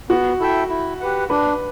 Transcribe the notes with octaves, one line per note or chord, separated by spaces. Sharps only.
B3 F#4
E4 A4 E5 G5
E4
G4 B4 F#5
D4 B4